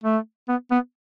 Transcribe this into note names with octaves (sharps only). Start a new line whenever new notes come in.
A3
B3
B3